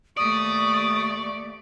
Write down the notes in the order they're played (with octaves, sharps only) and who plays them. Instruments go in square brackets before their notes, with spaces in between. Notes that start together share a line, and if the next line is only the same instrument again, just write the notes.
[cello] D#2 A3 [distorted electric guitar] D5 [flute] C#6 [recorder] D#6